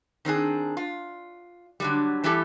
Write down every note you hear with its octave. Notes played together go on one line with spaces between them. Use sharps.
D#3 C4 D4 G#4
F4
D3 F#3 G3
E3 G3 A3 E4 G4 A4